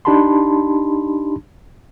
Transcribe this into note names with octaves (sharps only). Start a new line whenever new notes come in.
D4 D#4 G4 A5 B5 C6